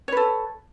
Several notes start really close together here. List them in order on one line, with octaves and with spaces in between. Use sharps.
C#5 B4 A4